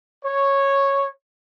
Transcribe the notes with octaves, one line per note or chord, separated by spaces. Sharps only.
C#5